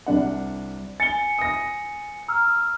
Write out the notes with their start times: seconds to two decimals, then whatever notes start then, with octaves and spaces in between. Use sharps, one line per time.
0.06 C2 D4 F#5
1.00 G#5 A6 C#7 G7
1.39 D#6 A#6
2.28 A#5 E6 F6